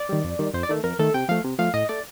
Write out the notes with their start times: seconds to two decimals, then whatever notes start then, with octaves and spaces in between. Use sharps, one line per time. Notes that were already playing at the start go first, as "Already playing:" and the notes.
Already playing: D5
0.09 D#3 G3
0.24 F2
0.39 D#3 G3
0.54 F2 C5
0.63 D5
0.69 D#3 A3
0.83 F2 A#4
0.99 D#3 A3 A4
1.14 C3 G5
1.29 F3 A3 F5
1.44 C3
1.59 F3 A3 F5
1.74 A2 D#5
1.89 A3 D5